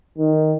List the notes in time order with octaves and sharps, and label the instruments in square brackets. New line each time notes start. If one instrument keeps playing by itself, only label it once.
[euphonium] D#3